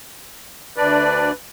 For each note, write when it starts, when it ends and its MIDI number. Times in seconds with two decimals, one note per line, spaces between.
0.77 1.31 38
0.77 1.31 62
0.77 1.32 71
0.77 1.31 74